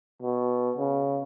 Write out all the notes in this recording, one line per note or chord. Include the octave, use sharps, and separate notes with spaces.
B2
C#3